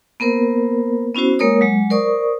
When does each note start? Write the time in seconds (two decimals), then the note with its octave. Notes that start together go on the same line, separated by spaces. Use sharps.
0.20 A#3 B3 A#4 C5
1.15 B3 C#4 E4 F#4 C5
1.39 G#3 A#3 A#4 C#5 D#6
1.61 F#3 G#3
1.90 A#4 C5 D5 C#6 D#6